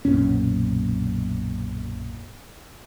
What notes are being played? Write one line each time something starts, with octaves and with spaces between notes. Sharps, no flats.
B1 F#2 A#2 C#4